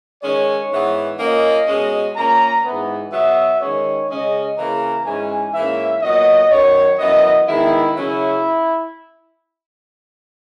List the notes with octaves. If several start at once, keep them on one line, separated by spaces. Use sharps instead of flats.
D#3 G#3 C#4 C#5
G#2 E3 B3
A#2 A#3 C#4 D#5
B2 G#3 C#4
A#2 A#3 C#4 A#5
G#2 E3 B3
B2 F#3 B3 E5
D#3 G#3 C#4 C#5
C#3 G#3 C#4 D#5
C#3 E3 A#3 C#4 A#5
G#2 E3 G#3 C#4 G#5
G#2 E3 A#3 C#4 E5
A#2 F#3 B3 D#5
F#2 D#3 F#3 C#5
F#2 E3 B3 D#5
D#3 G#3 B3 E4
C#3 F#3 C#4 E4